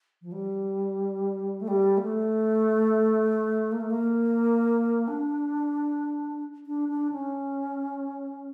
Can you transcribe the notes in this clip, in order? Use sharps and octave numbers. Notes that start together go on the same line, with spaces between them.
F3
G3
A3
G3
A#3
A3
A#3
A3
A#3
D4
D4
D4
C#4